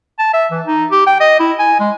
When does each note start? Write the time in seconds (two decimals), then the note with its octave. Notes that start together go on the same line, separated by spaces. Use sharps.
0.19 A5
0.34 E5
0.51 E3
0.67 D#4
0.91 G4
1.07 G5
1.20 D#5
1.40 E4
1.59 G#5
1.80 G#3